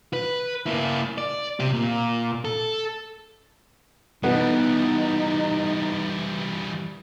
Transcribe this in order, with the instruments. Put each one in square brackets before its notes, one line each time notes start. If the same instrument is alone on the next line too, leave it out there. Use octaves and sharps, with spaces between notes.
[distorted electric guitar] B4
A#3 E4
D5
C3 G4
A#2
A4
[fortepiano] B2 B3 [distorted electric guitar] E3 G3 [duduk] D#4